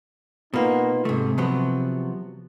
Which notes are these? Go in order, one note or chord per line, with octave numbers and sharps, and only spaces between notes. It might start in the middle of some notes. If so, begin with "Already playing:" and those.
B2 A#3 B3 D#4 F4
G#2 C3 A3
F3 F#3 B3